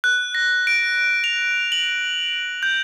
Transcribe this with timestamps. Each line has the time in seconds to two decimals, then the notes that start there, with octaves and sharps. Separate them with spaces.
0.04 F#6
0.35 A#6
0.67 D7
1.24 F7
1.72 F#7
2.63 G6